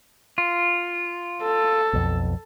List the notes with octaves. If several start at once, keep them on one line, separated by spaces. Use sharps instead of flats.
F4
A4
B1 F2